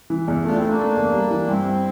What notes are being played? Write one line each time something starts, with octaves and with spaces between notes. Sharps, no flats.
E3
E2
A3 D4 F4
C4 E4
A3
A#3 D4
A3
E2
G3
E3
G2 C4 E4
G2